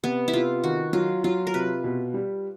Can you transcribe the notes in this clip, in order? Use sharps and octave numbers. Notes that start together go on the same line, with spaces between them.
C3 B3
E4
C3 F4
D#3 F#4
F#3 F4
F#3 F4
A#4
C3 B4
B2
G3